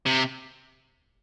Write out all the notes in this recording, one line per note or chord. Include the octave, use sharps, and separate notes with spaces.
C3